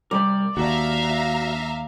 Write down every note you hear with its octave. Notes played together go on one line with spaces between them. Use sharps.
C3 G3 A#4 D5
D#2 D4 F#4 E5 F5 A#5